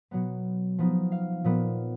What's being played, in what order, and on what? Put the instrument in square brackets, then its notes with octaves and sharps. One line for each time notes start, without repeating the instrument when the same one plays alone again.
[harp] B2 F#3 B3 F#5
F3 B3 D#4
F5
A#2 F3 B3